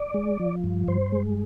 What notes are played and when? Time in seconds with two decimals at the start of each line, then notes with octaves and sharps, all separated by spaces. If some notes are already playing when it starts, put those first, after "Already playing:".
Already playing: D5
0.14 G#3
0.39 F3
0.64 G2
0.88 G2 C5
1.12 G#3